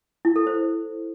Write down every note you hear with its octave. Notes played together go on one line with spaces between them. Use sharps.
E4
A4
C5